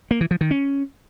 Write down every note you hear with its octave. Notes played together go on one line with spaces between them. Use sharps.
A#3
E3
F3
D#3
C#4